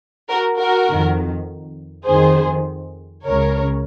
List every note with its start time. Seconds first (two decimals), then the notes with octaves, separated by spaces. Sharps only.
0.29 F#4 A#4
0.58 F#4 A#4
0.89 F2 D#3
2.06 F2 D#3 G#4 C5
3.25 C#2 C#3 A#4 C#5